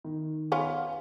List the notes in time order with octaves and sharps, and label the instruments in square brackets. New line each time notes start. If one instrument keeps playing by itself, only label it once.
[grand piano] D#3
[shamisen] B3 C#4 F4
[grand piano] F5